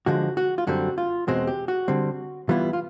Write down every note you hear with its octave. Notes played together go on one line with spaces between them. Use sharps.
D3 F3 G#3 F#4
F#4
F4
F#2 D3 G3 C4 F#4
F4
E2 B2 G#3 C4 F#4
G4
F#4
D3 G3 C4
E3 G3 B3 E4 F4
F4